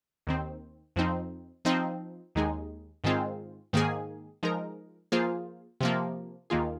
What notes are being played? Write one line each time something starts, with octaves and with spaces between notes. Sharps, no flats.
D#2 D#3 C4
F2 F3 C4 D#4
F3 C4 D#4
D#2 D#3 G#3 D#4 G#4
G#2 D#3 G#3 C4 F4
G#2 D#3 A#3 G#4
F3 G#3 D#4 A#4
F3 A#3 F4 G#4 C5
C3 F3 A#3
D#2 D#3 A#3 F4 G#4